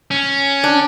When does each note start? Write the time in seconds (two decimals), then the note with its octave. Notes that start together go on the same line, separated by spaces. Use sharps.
0.11 C#4
0.64 D4